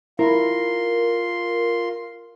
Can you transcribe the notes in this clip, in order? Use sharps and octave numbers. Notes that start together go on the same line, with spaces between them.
E4 F4 A#4 C6